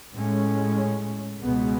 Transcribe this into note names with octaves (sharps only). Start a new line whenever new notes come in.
A2 G#3 C#4
C#2 B2 G#3 B3